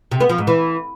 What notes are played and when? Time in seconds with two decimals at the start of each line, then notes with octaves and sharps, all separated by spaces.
0.11 C3
0.20 B3
0.29 F3
0.38 G#2
0.47 E3